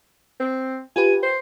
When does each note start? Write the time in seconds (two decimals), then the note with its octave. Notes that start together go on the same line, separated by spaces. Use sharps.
0.40 C4
0.96 F4 G4 B4 G#5
1.23 C5